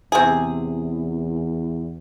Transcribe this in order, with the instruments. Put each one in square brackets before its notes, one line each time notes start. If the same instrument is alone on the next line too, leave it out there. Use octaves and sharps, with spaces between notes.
[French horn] E2 [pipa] C3 G#4